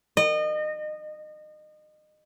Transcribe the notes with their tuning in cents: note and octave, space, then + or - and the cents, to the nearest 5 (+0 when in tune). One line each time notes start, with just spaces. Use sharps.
D#5 -30